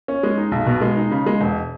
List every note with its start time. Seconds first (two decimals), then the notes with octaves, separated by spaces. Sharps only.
0.08 C#4
0.23 G#3
0.38 D#4
0.52 B1
0.66 B2
0.81 G#3
0.97 D#4
1.11 C#3
1.26 G#3
1.41 E1